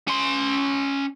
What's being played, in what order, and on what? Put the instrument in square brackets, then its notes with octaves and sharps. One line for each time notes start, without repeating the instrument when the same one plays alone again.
[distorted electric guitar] C#4 C6